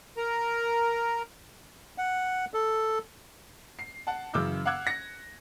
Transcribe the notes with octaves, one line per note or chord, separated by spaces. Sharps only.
A#4 A#5
F#5
A4
C7
F#5 A5
F#2 C#3 E3 D6 E6 G6
F5 F#5 D6 E6 F#6 G#6
A#6 C#7